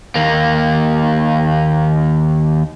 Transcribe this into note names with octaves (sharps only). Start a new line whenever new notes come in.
D#2 A#3